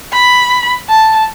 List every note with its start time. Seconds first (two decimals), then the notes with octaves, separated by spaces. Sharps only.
0.12 B5
0.89 A5